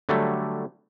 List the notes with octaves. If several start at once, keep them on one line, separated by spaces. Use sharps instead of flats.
D3 F#3 G3 A3